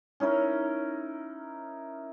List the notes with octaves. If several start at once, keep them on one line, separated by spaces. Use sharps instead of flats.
C#4 D#4 E4 A#4